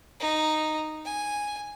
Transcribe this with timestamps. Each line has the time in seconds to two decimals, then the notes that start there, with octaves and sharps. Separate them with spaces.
0.20 D#4
1.05 G#5